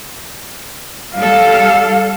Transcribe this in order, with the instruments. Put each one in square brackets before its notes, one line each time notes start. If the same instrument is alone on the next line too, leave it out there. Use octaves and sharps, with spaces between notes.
[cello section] G3 A4 [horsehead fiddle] F5